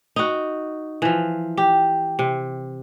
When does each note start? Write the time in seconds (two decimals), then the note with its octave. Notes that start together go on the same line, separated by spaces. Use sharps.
0.16 D#4 F#4
1.02 E3 F3
1.57 G4
2.19 C3